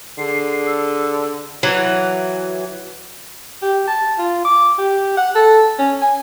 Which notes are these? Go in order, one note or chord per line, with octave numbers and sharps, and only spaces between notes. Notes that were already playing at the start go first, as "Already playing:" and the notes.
D3 G#4 C7
E6
E3 F#3
G4
A5
F4
D6
G4
F#5
A4
C#4
G#5